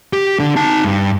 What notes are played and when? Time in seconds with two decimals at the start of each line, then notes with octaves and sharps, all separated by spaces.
0.13 G4
0.40 D3
0.56 D#4 A5
0.84 G2